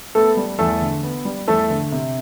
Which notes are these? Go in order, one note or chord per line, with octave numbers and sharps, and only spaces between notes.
A3 B3 A4
G3
E2 A3 A4
D3
B3
G3
E2 A3 A4
D3
C3